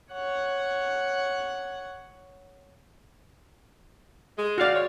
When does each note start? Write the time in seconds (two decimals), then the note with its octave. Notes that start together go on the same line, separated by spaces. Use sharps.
0.13 C#5 F#5
4.37 G#3
4.58 F#4 D5 F5
4.73 G#3 C#5